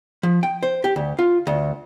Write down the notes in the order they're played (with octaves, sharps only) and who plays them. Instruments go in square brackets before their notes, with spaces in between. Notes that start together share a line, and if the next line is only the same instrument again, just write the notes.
[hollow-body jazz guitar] F3
G5
C5
G4
D2
F4
D2